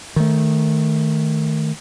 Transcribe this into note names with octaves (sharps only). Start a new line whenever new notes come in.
D#3 A3